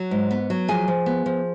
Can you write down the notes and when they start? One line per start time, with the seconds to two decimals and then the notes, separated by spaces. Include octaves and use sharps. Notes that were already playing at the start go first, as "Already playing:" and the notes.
Already playing: F#3 F#4
0.11 G#2
0.31 B3
0.50 F#3
0.68 F3 G#4 G#5
0.88 F3
1.06 B3
1.26 F3